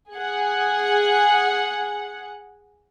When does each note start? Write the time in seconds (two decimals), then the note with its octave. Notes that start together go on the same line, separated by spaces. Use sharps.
0.13 G#4 F#5